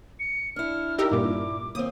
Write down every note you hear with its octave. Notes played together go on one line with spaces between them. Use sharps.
C#7
D4 E4 F6
D#4 G4 A#4 E6
G2 A#2 D6
D#2 C4 D#6